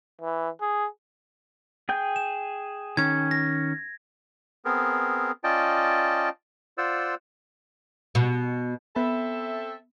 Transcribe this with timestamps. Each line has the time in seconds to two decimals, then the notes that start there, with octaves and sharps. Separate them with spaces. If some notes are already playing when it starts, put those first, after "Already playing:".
0.21 E3
0.61 G#4
1.89 G#4 G5 G6
2.16 E7
2.97 D#3 C#4 G#6
3.31 A#6
4.65 B3 C4 G#4 A#4
5.44 C#4 F4 D5 D#5 G5 A5
6.78 F4 C5 D5 F#5 E6
8.15 B2
8.96 B3 C4 A4 E5 B5